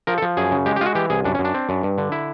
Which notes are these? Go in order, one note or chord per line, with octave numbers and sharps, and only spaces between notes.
F3 A#4
A4
F3
F#2 G#4
C#3
G#3 G4
G4
G#3 F4 F#4
E3 G4
C2 G#4
F#2 D4
C#4
F#2
D4
C4
F#2
G2
D3
E4